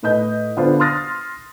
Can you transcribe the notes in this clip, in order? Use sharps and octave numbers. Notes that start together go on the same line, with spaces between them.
A2 B4 D#5 G6
D3 B3 D4 F4 C5
C6 D#6 F6 A6 A#6